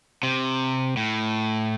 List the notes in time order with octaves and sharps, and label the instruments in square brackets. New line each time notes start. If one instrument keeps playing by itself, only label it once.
[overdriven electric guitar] C3
A2